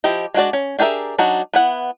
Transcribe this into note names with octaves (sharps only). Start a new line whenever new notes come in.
F3 E4 G4 D#5
G#3 D4 F#4 D5
C#4
D4 G4 G#4 A#4 E5
F#3 D4 D#4 F#4
B3 E4 F#5